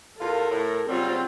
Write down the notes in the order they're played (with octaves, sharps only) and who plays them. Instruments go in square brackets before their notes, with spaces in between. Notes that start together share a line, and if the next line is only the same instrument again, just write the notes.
[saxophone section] E2 F4 [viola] A4 A#4
[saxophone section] A2
[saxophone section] C#3 F#3 G3 [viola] C4 F4